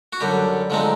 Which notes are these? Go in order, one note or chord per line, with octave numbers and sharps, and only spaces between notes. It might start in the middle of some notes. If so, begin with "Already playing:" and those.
F#4
F#2 D3 G3 G4
D3 F3 G#3 C4 D#4